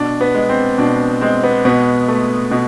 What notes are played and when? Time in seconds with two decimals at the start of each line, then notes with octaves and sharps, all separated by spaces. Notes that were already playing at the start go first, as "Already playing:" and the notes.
Already playing: B2 D4
0.21 B3
0.35 G#3
0.49 C4
0.78 B2 D4
1.21 G#3 C4
1.44 B3
1.65 B2 B3
2.08 A3
2.51 B2